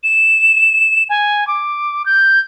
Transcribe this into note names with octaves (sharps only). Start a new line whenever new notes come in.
E7
G#5
D6
G6